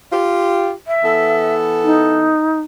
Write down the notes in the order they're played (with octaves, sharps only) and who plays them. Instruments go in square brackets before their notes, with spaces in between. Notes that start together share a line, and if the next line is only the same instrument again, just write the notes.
[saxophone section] F4 G4
[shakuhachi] E5
[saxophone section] E3 B3 A4
[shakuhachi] D#4